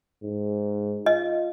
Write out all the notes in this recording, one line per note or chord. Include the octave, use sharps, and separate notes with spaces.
G#2
F4 D#5